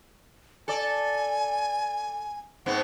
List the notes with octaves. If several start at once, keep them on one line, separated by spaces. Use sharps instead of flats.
A4 D5 G#5
G#2 B3 C4 F#5